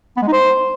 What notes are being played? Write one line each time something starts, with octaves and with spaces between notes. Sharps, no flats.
B3
G#3
D#4
C5